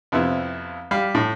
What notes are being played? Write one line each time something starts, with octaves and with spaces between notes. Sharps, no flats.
F2 C3 B3 E4
G3 F5
A2